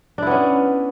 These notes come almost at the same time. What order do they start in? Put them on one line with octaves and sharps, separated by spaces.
D4 E4 B3 C#4